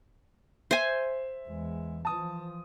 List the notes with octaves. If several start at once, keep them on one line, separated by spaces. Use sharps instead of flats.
C5 E5 G#5
E2 G#3
E3 F3 A5 D#6